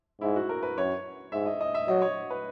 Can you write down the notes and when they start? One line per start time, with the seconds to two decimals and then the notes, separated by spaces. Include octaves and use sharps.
0.21 G#2 E4
0.36 F#4
0.49 A#4
0.63 B4
0.77 F#2 C#5
1.32 G#2 E5
1.46 D#5
1.61 D#5
1.74 E5
1.88 F#3 D#5
2.02 C#5
2.30 B4